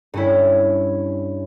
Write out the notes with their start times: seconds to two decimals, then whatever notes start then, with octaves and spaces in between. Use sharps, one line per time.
0.14 G2 C#4 E4